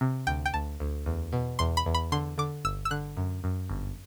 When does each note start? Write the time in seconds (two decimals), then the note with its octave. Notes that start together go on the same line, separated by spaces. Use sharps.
0.01 C3
0.27 D2 G5
0.46 G5
0.53 D2 A5
0.80 D2
1.06 E2
1.33 B2
1.59 E2 C6
1.77 B5
1.86 E2
1.94 B5
2.12 D3 C6
2.38 D3 D6
2.65 G1 E6
2.85 E6
2.91 D3 F#6
3.17 F#2
3.44 F#2
3.70 G1